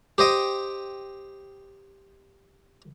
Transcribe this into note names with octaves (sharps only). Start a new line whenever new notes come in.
G4 C5 D#5 G5